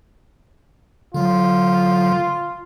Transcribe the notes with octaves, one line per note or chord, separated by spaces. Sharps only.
D3 F#3 F4